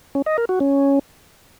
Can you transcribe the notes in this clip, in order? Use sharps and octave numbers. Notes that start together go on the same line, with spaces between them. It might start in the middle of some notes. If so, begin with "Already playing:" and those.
C#4
D#5
A#4
F#4
C#4